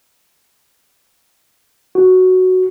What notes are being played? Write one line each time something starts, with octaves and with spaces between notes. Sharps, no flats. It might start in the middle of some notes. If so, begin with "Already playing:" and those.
F#4